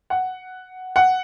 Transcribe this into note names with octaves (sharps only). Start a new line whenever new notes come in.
F#5
F#5